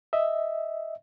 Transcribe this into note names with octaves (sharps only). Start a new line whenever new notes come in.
D#5 E5